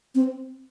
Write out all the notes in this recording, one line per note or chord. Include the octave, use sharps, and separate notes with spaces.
C4